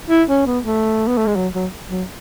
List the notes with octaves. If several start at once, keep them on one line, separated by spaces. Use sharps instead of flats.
E4
C#4
B3
A3
B3
A3
G#3
F#3
F#3
F#3